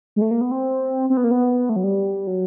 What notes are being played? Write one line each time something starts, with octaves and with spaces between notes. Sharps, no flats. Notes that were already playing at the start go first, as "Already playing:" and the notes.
G#3
A3
A#3
B3
C4
C4
B3
A#3
B3
A3
F#3
G3
F#3